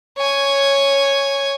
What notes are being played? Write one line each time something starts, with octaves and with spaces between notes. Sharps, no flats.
C#5 G#5